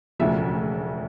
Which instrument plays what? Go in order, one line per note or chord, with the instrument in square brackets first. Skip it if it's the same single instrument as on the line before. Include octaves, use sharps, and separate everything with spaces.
[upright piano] E1 D2 C#3 F3 E5